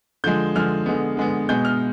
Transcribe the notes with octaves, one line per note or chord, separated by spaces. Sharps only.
D3 F3 G#3 G6
D3 F3 G#3 F6
D3 G#3 B3
D3 G#3 B3
B2 G#3 B3 G6
F6